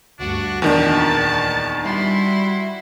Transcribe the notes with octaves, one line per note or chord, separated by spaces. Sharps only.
D2 G2 D4 F#4
E2 A#2 D#3 E3 D4 A5
G3 E4 F#4 C6